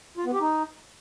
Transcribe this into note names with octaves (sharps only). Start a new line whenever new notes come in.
F4
B3
G4
D#4